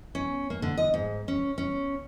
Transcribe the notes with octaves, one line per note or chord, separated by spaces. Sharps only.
C#4
A#3
D3
D#5
G#2
C#4
C#4